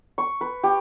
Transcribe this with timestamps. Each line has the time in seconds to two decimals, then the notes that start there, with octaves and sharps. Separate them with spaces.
0.18 C#6
0.41 B4
0.63 G4